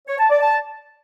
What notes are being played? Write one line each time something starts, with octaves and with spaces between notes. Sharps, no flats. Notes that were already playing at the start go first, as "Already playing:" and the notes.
C#5
A5
D5
A5